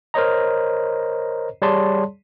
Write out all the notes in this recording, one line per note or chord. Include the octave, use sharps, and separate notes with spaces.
A#4 C5 C#5 D#5 A#5
G3 G#4 C#5 D5 A5 C6